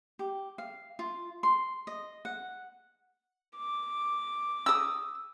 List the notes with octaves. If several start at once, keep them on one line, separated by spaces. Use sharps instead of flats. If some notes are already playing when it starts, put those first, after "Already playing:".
G4
F5
F4
C6
D#5
F#5
D6
D#6 E6